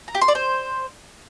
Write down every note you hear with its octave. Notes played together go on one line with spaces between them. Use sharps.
A#5
G4
C6
D5
C5